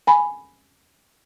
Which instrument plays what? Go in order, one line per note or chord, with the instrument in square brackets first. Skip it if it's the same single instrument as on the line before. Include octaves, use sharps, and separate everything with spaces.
[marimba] G#5 B5